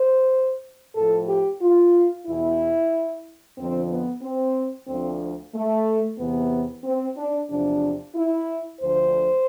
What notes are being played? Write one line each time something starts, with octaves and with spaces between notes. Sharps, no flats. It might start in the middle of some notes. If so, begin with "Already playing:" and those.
Already playing: C5
A2 F3 A4
G4
F4
E2 B2 E4
F2 D3 F3 C4
B3
C4
D2 D3 F3 C4
A3
E2 C3 E3 B3
C4
D4
E2 C3 F3 D4
E4
D2 D3 F3 C5